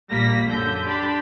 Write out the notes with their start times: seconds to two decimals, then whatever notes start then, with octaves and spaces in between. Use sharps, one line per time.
0.10 A#1 G3 A#3 A#6 B6
0.49 F#2 D3 A4 G6
0.85 D4 G4 A5 B5 C6